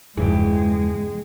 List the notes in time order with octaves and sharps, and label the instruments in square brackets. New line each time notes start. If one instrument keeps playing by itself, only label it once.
[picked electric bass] E2 E3 [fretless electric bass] G2 C#3 F3 [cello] G#3 [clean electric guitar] G#4 G5